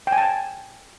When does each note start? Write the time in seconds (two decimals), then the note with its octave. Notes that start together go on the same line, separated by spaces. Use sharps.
0.07 G5
0.12 G#5
0.18 A5